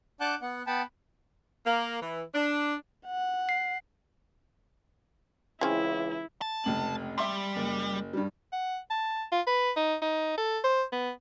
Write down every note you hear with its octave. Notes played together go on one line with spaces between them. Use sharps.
D4 F#5 A5 D6 F#6 G6
B3 F#5
B3 F#5 G5 A5 B5
A#3
E3
D4
F#5
C7
C#2 E3 C4 C#4 E4 G#4
A5
F1 C#2 F#7
G3 E5 C6
F#1
G2 G3
F#5
A5
F4
B4
D#4
D#4
A4
C5
B3